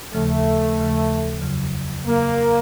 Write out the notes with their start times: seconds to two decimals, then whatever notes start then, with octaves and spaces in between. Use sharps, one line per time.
0.13 D#2 C#3 F3 A3
0.77 D#2 C#3 F3
1.42 F2 C#3 F#3
2.06 F2 C#3 F#3 A#3